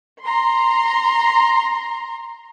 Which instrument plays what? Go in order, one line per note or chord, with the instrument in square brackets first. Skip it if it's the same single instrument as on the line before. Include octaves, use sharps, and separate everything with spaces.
[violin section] A#5 C6